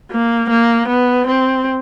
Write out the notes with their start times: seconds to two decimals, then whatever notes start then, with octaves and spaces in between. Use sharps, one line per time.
0.11 A#3
0.49 A#3
0.88 B3
1.27 C4